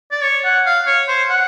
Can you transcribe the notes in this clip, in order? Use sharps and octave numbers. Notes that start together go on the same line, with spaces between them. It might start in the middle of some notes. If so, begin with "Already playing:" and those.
D5
C#5
F#5
F5
C#5
C5
F#5